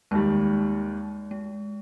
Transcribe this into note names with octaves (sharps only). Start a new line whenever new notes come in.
D#2 D#3 G3 G#3
G#3